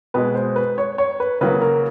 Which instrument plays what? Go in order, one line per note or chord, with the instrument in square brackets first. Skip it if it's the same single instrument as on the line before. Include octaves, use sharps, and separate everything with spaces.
[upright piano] B2 G#3 B4
C5
B4
C#5
C#5
B4
C#3 F#3 A#3 B4
A#4